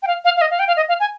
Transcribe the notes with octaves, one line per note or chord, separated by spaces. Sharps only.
G5
F5
F5
F5
D#5
F5
G5
F5
D#5
F5
G#5